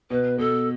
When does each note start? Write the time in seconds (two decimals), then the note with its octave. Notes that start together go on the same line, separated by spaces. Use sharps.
0.10 B2 B4
0.38 B2 A4